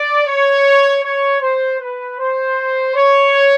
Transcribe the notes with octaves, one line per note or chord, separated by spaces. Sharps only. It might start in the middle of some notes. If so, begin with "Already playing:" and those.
Already playing: D5
C#5
C#5
C5
B4
C5
C#5